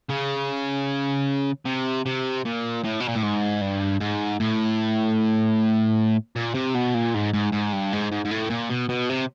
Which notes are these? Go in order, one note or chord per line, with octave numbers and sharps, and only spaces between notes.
C#3
C3
C3
A#2
A2
B2
A#2
A2
G#2
G2
G#2
A2
A#2
C3
B2
A#2
G#2
G#2
G#2
G2
G#2
G#2
G#2
A2
A#2
B2
B2
C3